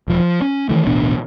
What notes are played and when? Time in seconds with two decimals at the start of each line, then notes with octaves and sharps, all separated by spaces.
0.08 E1 F3
0.20 F3
0.42 C#4
0.69 D#3 E3 A3
0.85 D1 A1 B2 D4